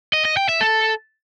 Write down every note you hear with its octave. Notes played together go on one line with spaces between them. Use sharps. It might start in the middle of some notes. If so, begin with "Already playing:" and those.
D#5
D#5
G5
E5
A4